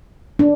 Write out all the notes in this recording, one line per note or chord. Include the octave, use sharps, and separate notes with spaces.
D4